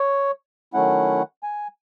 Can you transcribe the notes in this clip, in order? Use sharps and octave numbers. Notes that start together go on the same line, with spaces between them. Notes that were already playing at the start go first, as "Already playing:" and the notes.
Already playing: C#5
D#3 F#3 A3 C#4 E4 F#5
G#5